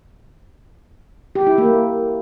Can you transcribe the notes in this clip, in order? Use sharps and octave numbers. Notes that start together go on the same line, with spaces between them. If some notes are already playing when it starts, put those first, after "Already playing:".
G4
E4
A#3